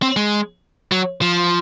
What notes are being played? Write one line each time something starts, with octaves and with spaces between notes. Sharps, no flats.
C4
G#3
F#3
F3